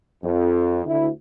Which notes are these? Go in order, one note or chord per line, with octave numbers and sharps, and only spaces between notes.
F2
D2 E4